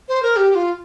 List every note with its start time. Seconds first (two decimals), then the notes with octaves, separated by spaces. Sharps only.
0.08 C5
0.22 A#4
0.36 G4
0.50 G4
0.55 F4